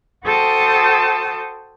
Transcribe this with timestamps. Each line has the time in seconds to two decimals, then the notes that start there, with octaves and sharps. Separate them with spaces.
0.24 F#4 A4 C5 G5 A5 D#6